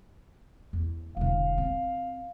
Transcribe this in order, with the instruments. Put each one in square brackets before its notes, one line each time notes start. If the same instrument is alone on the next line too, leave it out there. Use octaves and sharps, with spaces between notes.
[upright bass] E2
[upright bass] E1 D3 [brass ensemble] F5
[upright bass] C4